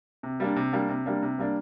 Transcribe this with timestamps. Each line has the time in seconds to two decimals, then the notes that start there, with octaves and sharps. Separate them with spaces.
0.23 C3
0.40 G3 A#3 D4
0.56 C3
0.73 G3 A#3 D4
0.89 C3
1.06 G3 A#3 D4
1.22 C3
1.38 G3 A#3 D4